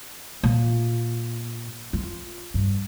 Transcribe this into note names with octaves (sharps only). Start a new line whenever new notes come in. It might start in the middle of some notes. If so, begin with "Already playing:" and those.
A#2
F4
G2